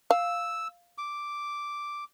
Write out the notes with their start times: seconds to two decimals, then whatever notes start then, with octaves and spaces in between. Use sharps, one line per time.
0.11 F5 E6
0.98 D6